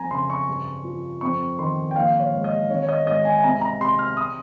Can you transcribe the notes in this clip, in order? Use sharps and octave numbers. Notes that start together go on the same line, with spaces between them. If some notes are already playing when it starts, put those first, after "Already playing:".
Already playing: F2 G#5 A#5
C#3 C6
C#6
G2
F3
F2 C#6
D#3 C6
G5
A#1 F5
C#5
G#2
D#5
G#1 C#5
C#5
D#5
G#2 D#5
G#5
G#5
C2 A#5
A#5
C3 C6
F6
D#6